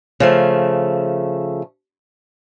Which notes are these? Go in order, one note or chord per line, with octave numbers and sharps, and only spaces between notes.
C#3 F3 A3